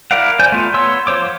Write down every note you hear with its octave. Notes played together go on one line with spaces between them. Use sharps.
E4 A#4 D5 F5 F#5
C5 D5 G#5 G6
A3 B3 F4
B3 C#5 C6 E6
F3 F4 C5 C#5 D6